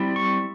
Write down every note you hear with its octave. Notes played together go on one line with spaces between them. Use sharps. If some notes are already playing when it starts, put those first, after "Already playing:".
Already playing: G3 C4 E4
C#6